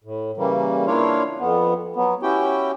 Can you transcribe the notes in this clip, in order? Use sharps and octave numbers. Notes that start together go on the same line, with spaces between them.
A2
C#3 E3 G3 A#3
A#3 D4 E4 F4 C#5 F5
F2 B3
F#3 B3
C#4 E4 F#4 G4 G5